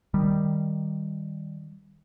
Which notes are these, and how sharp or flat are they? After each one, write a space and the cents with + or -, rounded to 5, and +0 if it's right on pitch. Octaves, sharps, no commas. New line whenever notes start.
D#3 +0 G3 +0